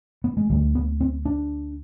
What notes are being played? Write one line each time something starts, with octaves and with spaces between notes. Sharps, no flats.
B3
G#3
D2 D3 G3
B3
C4
D4